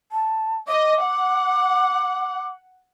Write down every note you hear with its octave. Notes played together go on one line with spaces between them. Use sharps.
A5
D#5 D6
F#5